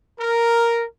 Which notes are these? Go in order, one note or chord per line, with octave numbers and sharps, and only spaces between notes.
A#4